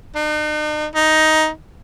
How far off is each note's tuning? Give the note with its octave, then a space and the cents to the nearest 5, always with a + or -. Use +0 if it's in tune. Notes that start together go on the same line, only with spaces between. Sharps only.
D#4 -45
D#4 +10